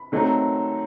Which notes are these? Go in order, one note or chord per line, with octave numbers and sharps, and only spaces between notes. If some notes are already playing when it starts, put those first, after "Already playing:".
Already playing: B5
D#3 F#3 A3 C4 D#4